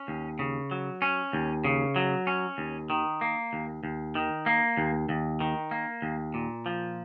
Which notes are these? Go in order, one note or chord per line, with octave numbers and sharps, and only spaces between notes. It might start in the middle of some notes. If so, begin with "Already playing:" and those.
Already playing: C#4
D#2
C#3
F#3
C#4
D#2
C#3
F#3
C#4
D#2
D#3
A#3
D#2
D#2
D#3
A#3
D#2
D#2
D#3
A#3
D#2
A#2
F3